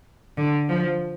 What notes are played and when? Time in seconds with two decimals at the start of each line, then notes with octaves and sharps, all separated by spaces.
0.37 D3
0.69 F3